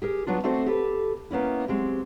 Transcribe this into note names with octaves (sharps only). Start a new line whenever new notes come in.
G4 G#4 A#4
F#3 B3 D4 F4
A3 C4 D4 F#4 A4 C5
G4 A4 B4
A#3 B3 C#4 E4
F#3 G#3 C4 G4